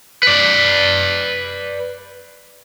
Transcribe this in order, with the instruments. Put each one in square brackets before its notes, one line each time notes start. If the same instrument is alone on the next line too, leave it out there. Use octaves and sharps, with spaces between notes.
[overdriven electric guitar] B4 D5